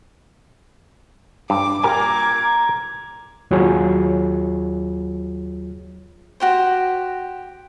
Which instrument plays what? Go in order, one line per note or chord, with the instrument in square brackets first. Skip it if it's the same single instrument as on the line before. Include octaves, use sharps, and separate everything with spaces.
[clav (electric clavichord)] G2 [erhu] D6
[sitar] A#2 A#3 [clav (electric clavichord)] G4 A#4 G#5 [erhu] D6 [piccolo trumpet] G#6
[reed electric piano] D#2 F#3 F4 G#4 C#5
[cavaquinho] F#4 G4 C5